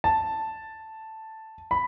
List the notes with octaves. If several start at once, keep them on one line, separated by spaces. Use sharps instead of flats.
A5
B5